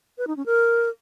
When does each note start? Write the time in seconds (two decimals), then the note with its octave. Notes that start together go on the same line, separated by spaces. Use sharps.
0.18 B4
0.27 D#4
0.37 C#4
0.46 A#4